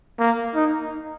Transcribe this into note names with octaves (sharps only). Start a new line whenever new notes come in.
A#3
D#4